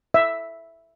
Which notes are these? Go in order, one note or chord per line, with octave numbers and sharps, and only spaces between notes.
E5